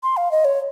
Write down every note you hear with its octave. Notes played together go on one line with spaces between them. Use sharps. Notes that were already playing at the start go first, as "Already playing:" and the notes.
C6
F5
D#5
C#5